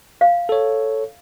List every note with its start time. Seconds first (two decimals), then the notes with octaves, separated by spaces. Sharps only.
0.21 F5
0.49 A4 C#5